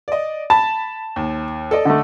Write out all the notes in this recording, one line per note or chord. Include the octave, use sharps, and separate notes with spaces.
D5 D#5
A5 B5
D#2
A4 D5 D#5
D3 A3